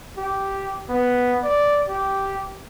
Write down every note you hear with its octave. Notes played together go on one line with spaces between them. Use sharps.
G4
B3
D5
G4